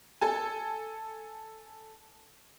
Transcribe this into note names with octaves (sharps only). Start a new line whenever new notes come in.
A4 G#5